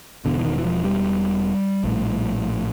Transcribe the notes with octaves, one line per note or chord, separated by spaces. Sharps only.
E1 E2 B2 D3
E3
D#3
E3
F3
G3
A#1 A2